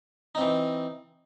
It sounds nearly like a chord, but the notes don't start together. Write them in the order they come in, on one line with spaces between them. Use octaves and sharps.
D#4 C4 E3